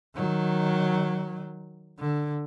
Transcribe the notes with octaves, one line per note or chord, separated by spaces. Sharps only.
D#3 F#3
D3